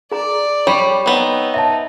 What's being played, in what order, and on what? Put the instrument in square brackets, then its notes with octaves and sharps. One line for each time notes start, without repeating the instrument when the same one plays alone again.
[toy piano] G#4 A#5 [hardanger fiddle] D5
[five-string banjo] G3 [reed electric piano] C#5 B5
[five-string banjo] B3 C4 [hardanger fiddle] D#4
[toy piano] E5 A5